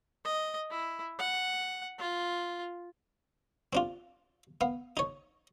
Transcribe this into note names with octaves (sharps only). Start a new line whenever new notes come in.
D#5
E4
F#5
F4
C4 D4 F4
B3 F5
D#4 C#5